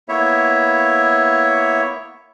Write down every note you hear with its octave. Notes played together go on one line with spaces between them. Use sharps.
A#3 B3 E4 C#5 E5